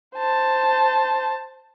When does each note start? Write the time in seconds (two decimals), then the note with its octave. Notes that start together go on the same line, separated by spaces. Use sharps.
0.16 C5 A5